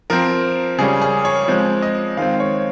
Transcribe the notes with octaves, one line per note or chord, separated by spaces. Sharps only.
F3 C4 A#4
C#3 G3 C#4 G#4
G#4
C#5
F3 G#3 C4
D#5
D#3 G#3 C4 F5
C#5